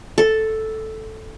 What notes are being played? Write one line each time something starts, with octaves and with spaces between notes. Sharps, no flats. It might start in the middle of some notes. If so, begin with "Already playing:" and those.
A4